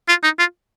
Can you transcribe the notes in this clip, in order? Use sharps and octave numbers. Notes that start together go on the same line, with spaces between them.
F4
D#4
F4